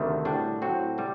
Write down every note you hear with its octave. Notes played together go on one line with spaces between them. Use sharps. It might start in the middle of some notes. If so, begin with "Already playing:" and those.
Already playing: D2 C3 D#3 A3
A2 G3 D4 F#4
A2 F#3 C4 F#4
C3 G3